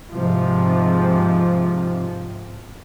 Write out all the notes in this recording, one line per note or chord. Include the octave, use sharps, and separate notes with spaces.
G#2 C3 F3